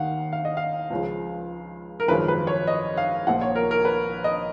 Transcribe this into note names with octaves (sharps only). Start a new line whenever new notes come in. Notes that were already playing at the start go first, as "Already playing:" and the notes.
Already playing: D#2 D#3 F5 F#5
F5
D#5
F5
C#2 C#3 F3
A#4
G#1 F#2 C#3 F3 B4
B4
C#5
D#5
F5
A#1 A#2 F3 F#5
C#5
A#4
A#4
B4
D#5